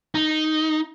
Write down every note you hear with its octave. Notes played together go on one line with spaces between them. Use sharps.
D#4